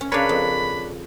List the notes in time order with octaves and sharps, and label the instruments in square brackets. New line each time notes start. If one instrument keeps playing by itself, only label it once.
[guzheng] C#4
[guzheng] C#3 A#4 [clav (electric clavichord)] D4 B4 C#5 [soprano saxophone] B5
[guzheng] F2